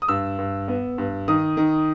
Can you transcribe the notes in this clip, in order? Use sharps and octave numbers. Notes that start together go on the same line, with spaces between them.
D#6
G2 E6
G2
B3
G2
D#3 D#6
D#3